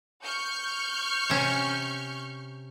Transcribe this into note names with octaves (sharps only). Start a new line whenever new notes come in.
C#6 F6 G6
C3 C#4